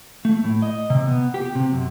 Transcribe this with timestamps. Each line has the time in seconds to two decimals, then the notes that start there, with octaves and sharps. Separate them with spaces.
0.25 A3
0.44 A2
0.62 D#5
0.90 C3
1.07 B3
1.34 G4
1.55 C3
1.73 F#2